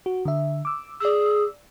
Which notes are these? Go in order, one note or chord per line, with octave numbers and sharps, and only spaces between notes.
F#4
D3 E5
D6 E6
G#4 D5 E6